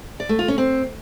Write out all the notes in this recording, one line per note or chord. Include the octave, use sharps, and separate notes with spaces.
D5
A3
F4
C#4
C4